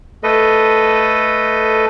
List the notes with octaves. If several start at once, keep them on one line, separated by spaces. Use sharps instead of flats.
A3 A4 B4 D#5